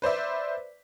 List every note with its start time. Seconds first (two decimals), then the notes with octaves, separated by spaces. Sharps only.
0.02 B4 C5 D5 E5